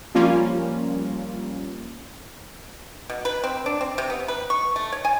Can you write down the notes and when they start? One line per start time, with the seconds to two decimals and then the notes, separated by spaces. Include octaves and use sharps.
0.15 F3 G3 A#3 C#4 F4
3.10 B2
3.25 B4
3.44 C4
3.66 D4
3.81 C4
3.98 C3
4.10 B3
4.28 B4
4.50 C#6
4.76 A3
4.92 C#5
5.05 G#5